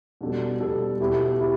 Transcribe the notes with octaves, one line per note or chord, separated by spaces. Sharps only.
B2 G3 D4 A4
B2 G3 D4 A4
B2 B3 E4 G4
E4 G4